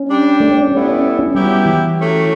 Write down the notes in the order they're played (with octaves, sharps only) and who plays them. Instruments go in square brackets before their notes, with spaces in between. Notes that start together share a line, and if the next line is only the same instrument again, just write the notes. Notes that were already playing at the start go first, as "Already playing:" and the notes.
Already playing: [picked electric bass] C#4
[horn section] G3 D4 G4
[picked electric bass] A3
C#4
C#4
[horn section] A2 G3 B3 E4 [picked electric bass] C#4
[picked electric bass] C#4
C#4
[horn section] F#3 B3 E4 G4 [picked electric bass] G3
[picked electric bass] E3
[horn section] F#3 A3 C#4 G4